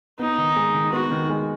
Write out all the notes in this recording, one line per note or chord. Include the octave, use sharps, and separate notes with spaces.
B3 D#4
D#3
G#3
D#3
B3 F#4
D#3
G#3